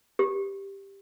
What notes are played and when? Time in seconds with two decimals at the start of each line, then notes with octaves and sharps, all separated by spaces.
0.19 G4